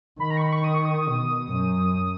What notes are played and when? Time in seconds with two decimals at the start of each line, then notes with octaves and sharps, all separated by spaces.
0.20 D#3 B5
0.31 A#5
0.37 C#6
0.42 B5
0.52 C#6
0.64 D#6
0.74 C#6
0.85 D#6
1.08 B2
1.52 F#2